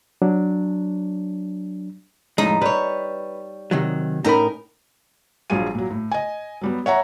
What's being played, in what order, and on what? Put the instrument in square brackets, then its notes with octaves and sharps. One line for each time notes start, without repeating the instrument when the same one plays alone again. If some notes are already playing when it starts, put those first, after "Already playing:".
[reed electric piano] F#3 D4
[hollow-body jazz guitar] F2 A2 G#3 [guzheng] D#4
[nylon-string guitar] G3 C#5 [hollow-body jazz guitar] B4
[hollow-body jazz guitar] C3 D#3 F#3
[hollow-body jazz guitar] A2 B5 [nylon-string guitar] C#4 D#4 A#4 [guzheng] A#5
[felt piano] A#1 F#3 G3 F4 G#4 D#7
A#2 F#3
A2
D#5 G#5
F#3 G3 B3
C#5 E5 F#5 A#5